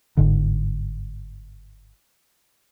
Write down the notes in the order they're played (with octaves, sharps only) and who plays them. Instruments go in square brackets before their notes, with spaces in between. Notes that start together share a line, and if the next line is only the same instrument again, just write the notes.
[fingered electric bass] G1 G#2 D3